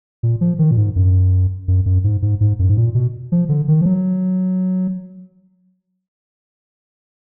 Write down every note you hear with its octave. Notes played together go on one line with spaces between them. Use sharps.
A#2
F3
D#3
A#2
G#2
F#2
F#2
F#2
G#2
G#2
G#2
F#2
G#2
A#2
B2
F3
D3
D#3
F3
F#3